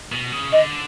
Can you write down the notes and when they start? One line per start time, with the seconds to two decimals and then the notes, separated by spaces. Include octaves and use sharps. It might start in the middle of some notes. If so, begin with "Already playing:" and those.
0.12 B2
0.32 C#3
0.52 D3 D#5